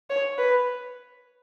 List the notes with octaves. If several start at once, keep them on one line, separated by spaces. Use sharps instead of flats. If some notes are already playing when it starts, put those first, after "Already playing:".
C#5
B4